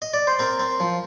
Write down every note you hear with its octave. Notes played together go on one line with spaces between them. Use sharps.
D#5
D5
C5
C4 A#4
C4
F3